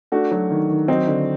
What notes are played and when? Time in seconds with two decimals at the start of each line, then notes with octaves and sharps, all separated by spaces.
0.12 A3 D4 F#4
0.31 F#3
0.50 D#3
0.70 D#3
0.88 F#3 C4 D#4
1.08 D3